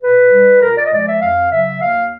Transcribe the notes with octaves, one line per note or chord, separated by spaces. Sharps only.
A#2 B4
G3
A#2 A#4
D5
D#5
F3 G#3 D5
E5
F2 F5
C#3 F#3 E5
D#2 F5